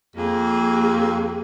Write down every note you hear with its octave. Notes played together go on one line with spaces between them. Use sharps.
F2 A#3 G#4